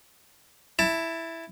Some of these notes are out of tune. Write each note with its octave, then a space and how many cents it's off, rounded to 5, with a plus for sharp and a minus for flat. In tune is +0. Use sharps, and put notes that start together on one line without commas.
E4 +0 A5 +15